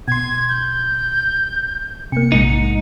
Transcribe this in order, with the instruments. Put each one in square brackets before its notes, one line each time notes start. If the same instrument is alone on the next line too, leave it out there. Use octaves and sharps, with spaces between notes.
[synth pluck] B2 C6 [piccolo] G#6
[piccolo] G6
[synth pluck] C3 A#3 [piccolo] C#7
[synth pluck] A#1 [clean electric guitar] G#2 D#4